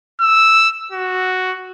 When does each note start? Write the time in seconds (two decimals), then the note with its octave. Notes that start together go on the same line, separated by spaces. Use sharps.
0.21 E6
0.92 F#4